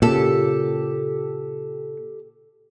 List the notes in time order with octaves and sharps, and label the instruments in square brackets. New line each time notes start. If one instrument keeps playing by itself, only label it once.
[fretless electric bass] A#2 C#3 [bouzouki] G4 A4